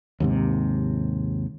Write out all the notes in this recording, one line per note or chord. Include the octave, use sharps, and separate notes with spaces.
D#2 G#2 C3